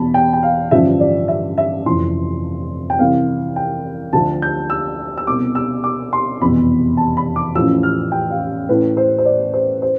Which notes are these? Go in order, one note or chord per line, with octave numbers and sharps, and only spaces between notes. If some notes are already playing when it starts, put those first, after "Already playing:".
Already playing: E2 B2 A5 B5
G5
G5
F5
A1 G2 D3 F3 E5
D5
E5
E5
F1 F2 E3 C6
G5
C2 C3 E3 F5
G5
D2 D3 F3 A5
G6
E6
E6
C2 B2 D6
E6
D6
C6
F1 E2 B2 B5
A5
B5
D6
A1 A2 F3 E6
F6
G5
F5
A1 A2 E3 B4
C5
C5
D5
C5
C5